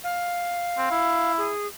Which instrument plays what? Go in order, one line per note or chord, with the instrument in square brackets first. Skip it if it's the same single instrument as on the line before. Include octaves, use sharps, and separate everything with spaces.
[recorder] F5
[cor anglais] C4
E4
[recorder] G#4